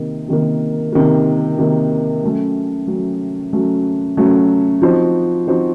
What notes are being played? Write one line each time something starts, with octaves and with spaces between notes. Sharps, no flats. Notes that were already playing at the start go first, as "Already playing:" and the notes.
Already playing: C3 D#3 A#3
C3 D#3 A#3
C3 D#3 A#3
C3 D#3 A#3
F#3 A3 C#4
F#3 A3 C#4
F#3 A3 C#4
F#3 A3 C#4
F3 C4 D#4 F#4 C5
F3 C4 D#4 F#4 C5